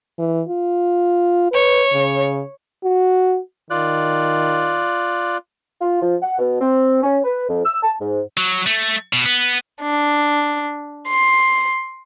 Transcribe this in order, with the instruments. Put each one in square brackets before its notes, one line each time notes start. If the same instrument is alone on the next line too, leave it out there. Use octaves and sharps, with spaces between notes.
[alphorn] E3
F4
[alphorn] B4 [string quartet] C#5
[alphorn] C#3
[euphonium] F#4
[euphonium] D#3 [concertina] F4 D5 F#6
[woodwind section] F4
F3
F#5
B2
C4
C#4
B4
F2
E6
A5
G#2
[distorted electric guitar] F#3
A3
B2
B3
[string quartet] D4
C6